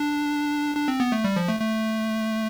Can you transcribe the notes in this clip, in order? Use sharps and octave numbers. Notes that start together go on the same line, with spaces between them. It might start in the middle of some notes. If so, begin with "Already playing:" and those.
Already playing: D4
D4
C4
B3
A3
G3
F3
A3
A3